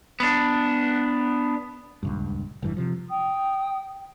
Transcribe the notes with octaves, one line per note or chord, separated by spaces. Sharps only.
B3 D4
D#1 C#2 G2
F1 G2 E3
C3 F3
G5 D#6